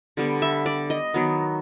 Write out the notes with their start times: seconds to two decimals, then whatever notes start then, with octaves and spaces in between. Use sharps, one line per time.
0.17 D3 G3 B3
0.42 E5
0.66 D5
0.90 D#5
1.14 D#3 F#3 B3